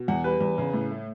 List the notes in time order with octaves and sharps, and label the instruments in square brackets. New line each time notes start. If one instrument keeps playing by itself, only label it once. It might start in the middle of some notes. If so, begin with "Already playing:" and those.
Already playing: [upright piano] B2
[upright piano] E2 [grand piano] F#5
[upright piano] G3 [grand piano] B4
[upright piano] E2
C#3
A2
A3